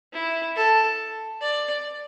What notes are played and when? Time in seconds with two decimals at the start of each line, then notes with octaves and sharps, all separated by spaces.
0.13 E4
0.56 A4
1.41 D5